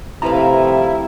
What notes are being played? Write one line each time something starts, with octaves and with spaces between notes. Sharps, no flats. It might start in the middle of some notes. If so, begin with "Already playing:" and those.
C3 F3 G3 A3 E4 B4 F5 A#5